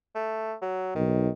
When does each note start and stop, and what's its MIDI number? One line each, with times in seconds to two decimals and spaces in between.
0.15 0.55 57
0.61 0.94 54
0.95 1.29 35
0.95 1.30 51